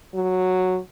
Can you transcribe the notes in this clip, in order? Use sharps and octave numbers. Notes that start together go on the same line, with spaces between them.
F#3